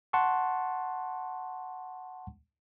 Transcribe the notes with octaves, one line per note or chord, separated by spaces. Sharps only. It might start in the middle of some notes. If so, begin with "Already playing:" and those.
F#5 A5 C6 C#6